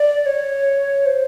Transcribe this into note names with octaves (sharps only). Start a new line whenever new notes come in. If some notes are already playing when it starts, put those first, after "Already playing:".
Already playing: D5
C#5
C5